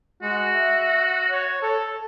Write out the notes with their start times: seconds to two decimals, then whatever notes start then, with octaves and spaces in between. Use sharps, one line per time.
0.22 G#3 F#4
0.54 E5
1.31 C#5
1.63 A4